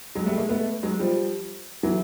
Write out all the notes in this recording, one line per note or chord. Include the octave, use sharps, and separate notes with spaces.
F#3 G#3
G3 A3
G#3 A#3
A3 B3
F#3 G#3
F3 G3
E3 F#3